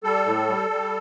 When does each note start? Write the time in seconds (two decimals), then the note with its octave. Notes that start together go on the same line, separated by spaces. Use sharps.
0.04 G3 A4
0.26 A2
0.48 G3
0.70 G3